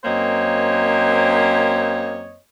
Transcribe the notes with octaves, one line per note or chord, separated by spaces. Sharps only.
F#2 A#3 C4 C5 C#5 D#5